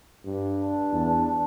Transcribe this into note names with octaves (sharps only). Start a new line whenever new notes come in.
G2
D4
E2